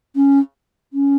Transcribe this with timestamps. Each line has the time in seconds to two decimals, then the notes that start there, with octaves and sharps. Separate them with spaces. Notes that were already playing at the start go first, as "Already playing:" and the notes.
0.16 C#4
0.93 C#4